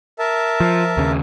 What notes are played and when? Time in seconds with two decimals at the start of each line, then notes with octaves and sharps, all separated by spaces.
0.19 A#4 E5 A5
0.60 F3
0.97 D#2 C#3